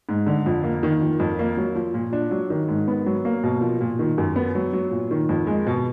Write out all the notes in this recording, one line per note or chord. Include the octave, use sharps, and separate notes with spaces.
G#2
D3
F2
A#3
D#3
F3
F2
A#3
F#3
F3
A#2
D4
F#3
D#3
G#2
B3
F#3
A#3
B2
F3
A#2
D#3
F#2
B3
F#3
F#3
A#2
D#3
F2
G#3
B2